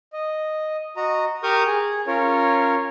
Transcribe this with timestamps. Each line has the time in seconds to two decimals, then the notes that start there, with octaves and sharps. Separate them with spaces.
0.13 D#5
0.96 F#4 D#5 A#5
1.43 G4 A#4 C#6 D#6 F6 G6
1.66 G#4
2.07 C#4 F4 A#4 C#5